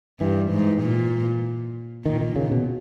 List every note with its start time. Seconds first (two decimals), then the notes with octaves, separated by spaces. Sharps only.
0.20 G2 E3
0.51 G#2
0.82 A#2
2.06 A#2 D#3
2.21 D#3
2.36 C#3
2.52 B2